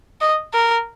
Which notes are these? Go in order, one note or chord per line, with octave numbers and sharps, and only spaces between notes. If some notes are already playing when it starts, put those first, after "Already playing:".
D#5
A#4